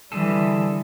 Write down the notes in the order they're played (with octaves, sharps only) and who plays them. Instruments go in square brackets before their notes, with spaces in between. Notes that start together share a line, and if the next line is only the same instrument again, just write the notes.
[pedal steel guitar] D3 G#4 A4 [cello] E3 G3